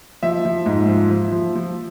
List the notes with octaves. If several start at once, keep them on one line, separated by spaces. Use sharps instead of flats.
F3 E5
F3
G#2
F3
F3
F3
F3